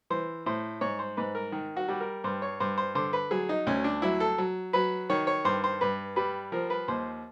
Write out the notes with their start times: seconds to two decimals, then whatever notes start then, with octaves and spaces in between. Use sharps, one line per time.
0.10 E3 C5
0.46 A2 C5
0.81 G#2 C#5
0.99 C5
1.17 G#2 B4
1.35 A#4
1.52 D#3
1.77 F#4
1.88 G3
2.01 A#4
2.24 G2 C5
2.42 C#5
2.60 G2 C5
2.78 C5
2.95 D3 C5
3.13 B4
3.31 F#3 G#4
3.49 D#4
3.67 D2 C#4
3.84 D4
4.02 F#3 E4
4.20 A4
4.38 F#3
4.73 F#3 B4
5.10 D#3 C#5
5.27 C#5
5.45 G2 C5
5.64 C5
5.81 G2 B4
6.16 G3 B4
6.52 F3 A#4
6.70 B4
6.88 D#2 C5